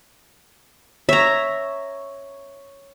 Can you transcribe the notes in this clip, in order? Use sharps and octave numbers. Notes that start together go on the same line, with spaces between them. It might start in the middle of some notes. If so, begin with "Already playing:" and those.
C#5 E5 A#5